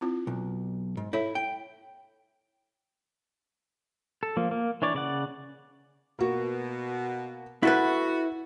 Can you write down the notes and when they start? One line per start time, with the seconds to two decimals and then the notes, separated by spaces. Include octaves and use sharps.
0.01 C4 E4 F4
0.27 B1
0.97 G#2
1.13 E4 A4 C#5 E5
1.35 G5
4.23 A4
4.37 F3 A#3
4.51 A#3
4.82 E3 D4 C#5 D5
4.94 C#3 D5 F#5
6.19 B2 A#3 F#4
7.63 E4 F#4 A4 B4 F#5